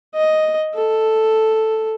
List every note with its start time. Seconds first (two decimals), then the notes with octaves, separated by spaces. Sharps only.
0.15 D#5
0.75 A4